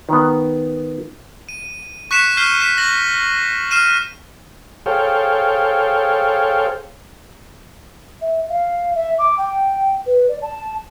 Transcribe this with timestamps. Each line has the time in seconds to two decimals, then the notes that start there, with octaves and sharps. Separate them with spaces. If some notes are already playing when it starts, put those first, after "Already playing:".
0.09 D#3 B3
1.49 D#7
2.11 C#6 F#6 B6 C#7 E7
2.37 F6 G6 B6 C7 D#7 G7
2.60 B6 E7
2.78 A#6 F#7
3.71 F6 C7 D#7 E7
4.86 G#4 A4 C5 C#5 F5 G5
8.21 E5
8.49 F5
8.95 E5
9.18 D6
9.38 G5
10.06 B4
10.28 D5
10.42 A5